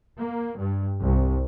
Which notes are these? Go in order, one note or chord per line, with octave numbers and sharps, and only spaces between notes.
A#3
G2
C2